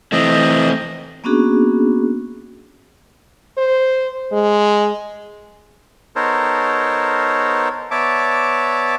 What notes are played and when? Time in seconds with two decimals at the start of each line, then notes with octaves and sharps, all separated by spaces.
0.12 E3 A3 C4 D#5
1.24 A#3 B3 C#4 D4 F#4 G#4
3.58 C5
4.32 G#3
6.16 B3 D#4 A4 A#4 C5 C#5
7.91 B3 C#5 D5 E5 A5 D6